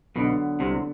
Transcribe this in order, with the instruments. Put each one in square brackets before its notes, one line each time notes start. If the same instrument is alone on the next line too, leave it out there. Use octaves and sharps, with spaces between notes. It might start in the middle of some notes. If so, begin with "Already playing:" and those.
[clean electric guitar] B1 B2 [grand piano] D3 F#3 B3 D4
[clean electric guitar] C2 C3